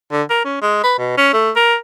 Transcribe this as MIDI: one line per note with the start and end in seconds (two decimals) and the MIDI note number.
0.12 0.23 50
0.30 0.42 70
0.45 0.60 61
0.62 0.79 56
0.83 0.94 71
0.98 1.16 47
1.17 1.33 61
1.33 1.51 57
1.56 1.75 70